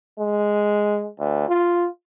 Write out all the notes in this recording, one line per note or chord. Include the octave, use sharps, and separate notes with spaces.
G#3
D2
F4